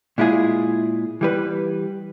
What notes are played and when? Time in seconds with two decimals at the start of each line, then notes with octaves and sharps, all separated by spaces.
0.18 A#2 G#3 E4 F4 G#4
1.21 E3 G3 B4